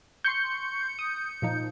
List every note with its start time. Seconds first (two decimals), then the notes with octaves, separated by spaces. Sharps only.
0.24 C6 C#6 G6 C#7
0.99 D#6
1.42 A#2 F3 D#4